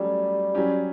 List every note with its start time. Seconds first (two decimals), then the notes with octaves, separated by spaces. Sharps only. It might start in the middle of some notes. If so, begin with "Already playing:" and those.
Already playing: F#3 G3 A3 C#4
0.55 F#3 C#4 G4